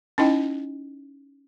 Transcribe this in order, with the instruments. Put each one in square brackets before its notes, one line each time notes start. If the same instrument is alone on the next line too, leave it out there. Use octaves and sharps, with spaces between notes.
[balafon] C#4 D#4 E4 D#5 G5